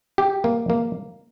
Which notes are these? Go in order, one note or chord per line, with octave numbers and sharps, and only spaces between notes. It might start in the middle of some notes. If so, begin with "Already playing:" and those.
G4
A#3
A#3